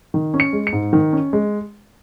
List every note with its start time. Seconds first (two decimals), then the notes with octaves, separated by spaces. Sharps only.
0.14 D#3
0.34 C#4
0.40 C#7
0.53 G#3
0.67 C#7
0.73 G#2
0.93 D#3
1.13 C#4
1.33 G#3